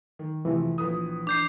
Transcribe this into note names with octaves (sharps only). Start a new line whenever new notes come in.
D#3
F2 C3 E3 A3
A#1 B4 D#6
D4 D6 G6 C7